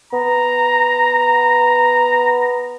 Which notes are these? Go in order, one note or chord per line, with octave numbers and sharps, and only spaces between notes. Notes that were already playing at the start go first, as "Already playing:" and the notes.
B3 A#5